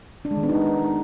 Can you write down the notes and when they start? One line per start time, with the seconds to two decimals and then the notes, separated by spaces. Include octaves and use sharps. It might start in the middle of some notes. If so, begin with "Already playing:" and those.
0.25 D4
0.31 G#3
0.37 D#3
0.43 B3
0.49 D#4